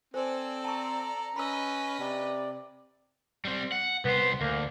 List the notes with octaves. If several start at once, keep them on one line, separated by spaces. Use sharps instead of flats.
C4 A4 C5 D5 G#5
A5 A#5 C#6
C#4 B4 D#5 B5 E6
C3 D5
G3 C4
F#5
C2 B3 C5
D2 A#3